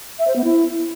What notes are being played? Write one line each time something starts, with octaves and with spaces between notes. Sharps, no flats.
E5
C5
B3
E4